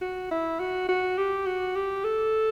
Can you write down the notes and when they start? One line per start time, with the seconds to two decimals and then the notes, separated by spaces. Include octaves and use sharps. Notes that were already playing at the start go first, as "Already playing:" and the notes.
0.01 F#4
0.31 E4
0.59 F#4
0.88 F#4
1.18 G4
1.46 F#4
1.76 G4
2.04 A4